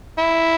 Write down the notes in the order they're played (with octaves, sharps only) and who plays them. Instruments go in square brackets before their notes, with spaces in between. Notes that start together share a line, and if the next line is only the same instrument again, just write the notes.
[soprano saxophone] E4